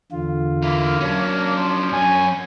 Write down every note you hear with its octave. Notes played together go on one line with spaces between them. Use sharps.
E2 D3 F4
A#3 E4 F5
F#3 C#4 D4
F3
F#2 C#4 G#5